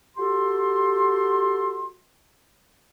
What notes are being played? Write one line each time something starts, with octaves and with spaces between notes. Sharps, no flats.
F#4 G4 A4 C6